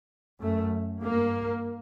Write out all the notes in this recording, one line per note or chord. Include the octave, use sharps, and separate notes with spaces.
F#2 A3
G2 A#3